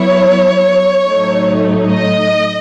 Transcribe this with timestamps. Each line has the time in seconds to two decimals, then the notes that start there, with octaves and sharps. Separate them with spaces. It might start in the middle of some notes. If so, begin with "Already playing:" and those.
Already playing: F#3 B3 E4 C#5
1.06 A2 F#3 A3 D#4
1.89 D#5